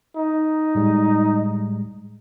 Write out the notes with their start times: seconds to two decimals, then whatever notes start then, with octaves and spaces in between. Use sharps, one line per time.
0.16 D#4
0.75 A2 G3 G#3